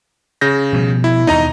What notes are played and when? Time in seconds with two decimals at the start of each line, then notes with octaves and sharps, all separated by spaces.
0.41 C#3 G6 A#6
0.73 B2 F3 G3
1.04 E4
1.27 D#2 B2 D#4 D#5 A#5